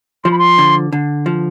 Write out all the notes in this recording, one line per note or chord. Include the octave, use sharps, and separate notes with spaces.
F3 C6
B5
C6
D3
D3
F3